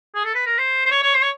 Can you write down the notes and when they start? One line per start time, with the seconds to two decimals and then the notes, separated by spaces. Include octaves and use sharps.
0.15 G#4
0.25 A4
0.35 B4
0.46 A#4
0.58 C5
0.86 C5
0.91 C#5
1.03 C#5
1.14 C5
1.22 C#5